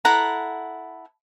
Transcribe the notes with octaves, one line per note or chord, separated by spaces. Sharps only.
E4 A4 F#5 A#5